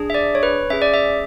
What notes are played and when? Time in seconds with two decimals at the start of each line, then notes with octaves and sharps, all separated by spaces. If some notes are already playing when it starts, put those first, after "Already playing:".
Already playing: D4 G#4
0.10 E5
0.14 D5
0.35 C#5
0.43 B4
0.70 C#4 G#4 E5
0.82 D5
0.94 E5